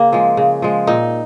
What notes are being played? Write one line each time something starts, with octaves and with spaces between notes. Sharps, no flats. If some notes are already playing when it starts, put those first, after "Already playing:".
Already playing: C#3 A#3
F3 G#3
C#3
F3 G#3
A#2 D#4